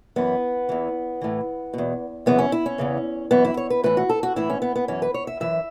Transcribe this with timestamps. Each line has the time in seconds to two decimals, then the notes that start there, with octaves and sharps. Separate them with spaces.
0.16 F#2 E3 B3
0.69 E2 E3
1.21 A2 E3
1.73 E2 B2
2.26 F#2 C#3 E3 B3
2.39 C#4
2.52 E4
2.66 C#4
2.78 E2 C#3 E3
3.31 F#2 E3 B3
3.45 E4
3.57 C#5
3.70 B4
3.83 A2 E3 B4
3.97 F#4
4.09 A4
4.23 F#4
4.36 A2 E3 E4
4.50 C#4
4.62 B3
4.76 B3
4.88 F#2 E3 C#4
5.02 B4
5.14 C#5
5.27 E5
5.40 F#2 E3 E5